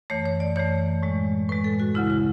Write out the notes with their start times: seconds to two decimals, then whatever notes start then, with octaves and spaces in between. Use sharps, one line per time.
0.10 F#2 E3 A3 C#5
0.26 C#5
0.40 D5
0.56 F#2 E3 A3 C#5
1.02 A2 G#3
1.49 A2 G#3 B4
1.64 A4
1.80 F#4
1.95 D2 C#3 G#3 E4
2.10 E4